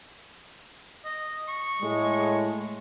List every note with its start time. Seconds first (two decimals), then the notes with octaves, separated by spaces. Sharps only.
1.05 D#5
1.49 C#6
1.81 A2 G#3